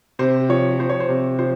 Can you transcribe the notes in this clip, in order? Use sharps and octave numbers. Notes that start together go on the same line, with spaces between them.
C3 C5
F3 C#5
F3 C5
C#5
C5
C3
F3 C5